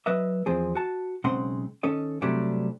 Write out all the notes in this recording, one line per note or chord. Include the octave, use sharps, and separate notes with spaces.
F#3 B4 D#5 E5
E2 F3 C4 G#4
F#4 A5
B1 C#3 G#3 C4 F#5 C6
D#3 C#4 A4 D#5
C3 F#3 G3 A3 D4